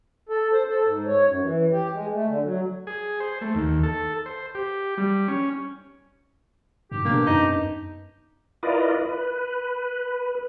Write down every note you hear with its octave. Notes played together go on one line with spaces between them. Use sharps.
A4
C5
A4
G#2
C#5
F#2
E3
G4
G#3
A3
D3
F#3
G#4
C5
A3
D#2
A4
C5
G4
G3
C#4
G#2 G4
B2 A#3 B3 D4
F#2 D#4
E4 F4 A#4 B4 D5 D#5
B4